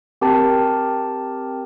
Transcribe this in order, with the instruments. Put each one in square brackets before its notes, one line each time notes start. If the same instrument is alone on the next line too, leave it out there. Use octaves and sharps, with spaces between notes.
[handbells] C4 G4 A#4 G5 A5